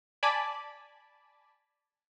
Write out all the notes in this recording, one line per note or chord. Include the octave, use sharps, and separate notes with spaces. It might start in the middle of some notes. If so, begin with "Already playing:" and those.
D5 G#5 A5 B5